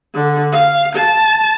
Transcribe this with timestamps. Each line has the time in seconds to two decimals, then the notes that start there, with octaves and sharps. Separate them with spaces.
0.15 D3
0.52 F5
0.95 A5